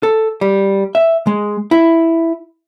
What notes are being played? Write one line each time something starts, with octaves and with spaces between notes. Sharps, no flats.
A4
G3
E5
G#3
E4